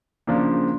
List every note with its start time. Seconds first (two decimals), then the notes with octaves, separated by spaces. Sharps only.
0.27 C#3 F3 A#3 D4